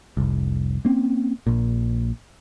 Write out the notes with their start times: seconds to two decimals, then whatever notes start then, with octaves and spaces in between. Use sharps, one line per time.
0.17 F1 C2
0.85 A#3 C4 C#4
1.47 A#1 A#2